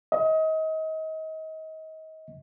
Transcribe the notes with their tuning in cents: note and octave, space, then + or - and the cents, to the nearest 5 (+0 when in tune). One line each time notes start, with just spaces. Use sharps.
D#5 +30